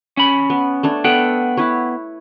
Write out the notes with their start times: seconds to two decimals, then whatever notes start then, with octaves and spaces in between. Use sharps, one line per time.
0.17 C#4 B5
0.50 B3
0.83 A3 D4 C#5
1.05 B3 A4 F#5 G5
1.57 E4 B4 C#5